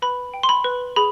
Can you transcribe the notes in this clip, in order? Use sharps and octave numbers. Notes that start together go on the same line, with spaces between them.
B4 B5
G5
C6
B5
B4
G#4 B5